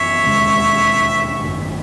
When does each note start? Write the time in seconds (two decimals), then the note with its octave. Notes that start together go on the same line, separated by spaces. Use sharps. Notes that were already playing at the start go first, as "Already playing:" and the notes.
Already playing: F#2 E3 B3 C#5 E5
0.26 E1 D#2 C#3 G#3
1.43 G#1 F#2 D#3 A3